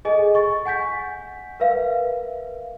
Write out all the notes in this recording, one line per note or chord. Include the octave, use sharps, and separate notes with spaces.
G#4 A4 D#5 G#5
C#6 A6
F#5 G#5 G6 B6
A#4 B4 E5 F5